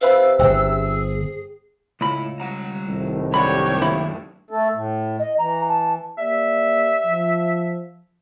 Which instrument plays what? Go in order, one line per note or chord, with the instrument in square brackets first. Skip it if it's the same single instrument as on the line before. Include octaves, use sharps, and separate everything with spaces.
[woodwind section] C3 E5 E6 [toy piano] B4 C5 B5 [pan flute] F5
[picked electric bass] D1 G1 [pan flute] G#4 [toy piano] C5 G5
[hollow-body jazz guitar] C#2 B5 [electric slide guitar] A2 E4
[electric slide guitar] G3 F#5 A#5
[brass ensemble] C2 A2 D#3
[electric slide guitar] F#2 A3 D4 [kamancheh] G4 C#5 [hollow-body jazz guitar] D5 F#5 B5
[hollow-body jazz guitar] D#2 E4 B5
[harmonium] A3 A4
A2
[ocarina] D#5
[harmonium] E3 [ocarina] A#5
[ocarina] A5
[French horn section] A#3 G4 D5 [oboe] E5
[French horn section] F3